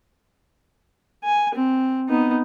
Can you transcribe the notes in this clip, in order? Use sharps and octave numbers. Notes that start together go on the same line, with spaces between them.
G#5
C4
B3 D#4